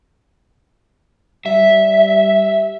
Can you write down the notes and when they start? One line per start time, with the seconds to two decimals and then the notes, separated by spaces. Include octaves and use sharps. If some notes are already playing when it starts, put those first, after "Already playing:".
1.46 G3 E5